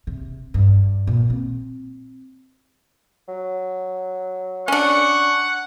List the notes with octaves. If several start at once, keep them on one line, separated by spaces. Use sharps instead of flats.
C3
G2
A#2
C4
F#3
C#4 D4 F#5 C#6